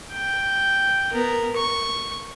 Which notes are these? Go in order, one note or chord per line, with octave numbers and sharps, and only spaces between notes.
G5
B3 A#4
C#6